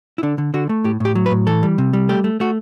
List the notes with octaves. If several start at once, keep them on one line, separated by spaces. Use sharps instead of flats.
E4
D3 D4
D3
D3 F#4
A3
A2 G4
A2 G4
F#3
B4
A2
E3 A4
G3
C3
G3
A3 G4
A3
A3 F#4